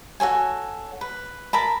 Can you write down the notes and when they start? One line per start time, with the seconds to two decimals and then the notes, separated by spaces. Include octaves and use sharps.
0.20 F#4 A4 C#5 G#5
1.01 B4
1.53 A#4 A5 B5